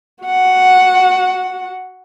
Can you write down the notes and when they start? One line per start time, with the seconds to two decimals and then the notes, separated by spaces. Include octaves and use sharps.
0.23 F#4 F#5